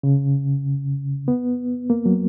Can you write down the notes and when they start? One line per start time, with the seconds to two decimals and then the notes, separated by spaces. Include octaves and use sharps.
0.03 C#3
1.28 B3
1.90 A#3
2.06 F#3